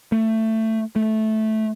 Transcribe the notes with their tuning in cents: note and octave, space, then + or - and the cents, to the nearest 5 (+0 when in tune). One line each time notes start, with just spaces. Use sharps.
A3 +15
A3 -10